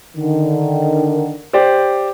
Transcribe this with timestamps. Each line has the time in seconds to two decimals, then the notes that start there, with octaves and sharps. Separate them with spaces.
0.17 D3 D#3
1.53 G4 C5 D5